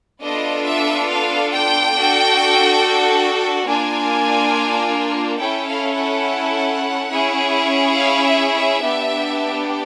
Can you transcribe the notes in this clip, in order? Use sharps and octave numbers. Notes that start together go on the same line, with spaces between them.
B3 D4 F4 A4 D#5
E5
F5
G5
D4 F#4 A4
A#3 D4 F4 G#5
C#4 E4 A4 G5
F5
F#5
C#4 E4 G#4
F5
E5
E5
B3 D4 G4